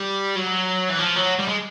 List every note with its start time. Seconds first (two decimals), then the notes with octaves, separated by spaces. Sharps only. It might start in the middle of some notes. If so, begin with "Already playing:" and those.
Already playing: G3
0.36 F#3
0.89 E3
0.99 F3
1.16 F#3
1.39 G3
1.49 G#3